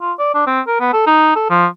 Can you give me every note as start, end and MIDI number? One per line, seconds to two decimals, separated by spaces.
0.01 0.13 65
0.19 0.32 74
0.34 0.43 62
0.47 0.61 60
0.67 0.79 70
0.80 0.91 59
0.93 1.02 69
1.07 1.35 63
1.36 1.47 69
1.50 1.66 53